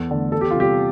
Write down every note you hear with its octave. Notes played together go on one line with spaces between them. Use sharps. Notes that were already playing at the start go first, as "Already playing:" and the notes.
Already playing: E2 A4
D3 A3
E2 A4
G4
F4
C3 G3 G4